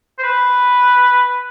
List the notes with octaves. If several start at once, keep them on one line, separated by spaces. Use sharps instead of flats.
C5
B4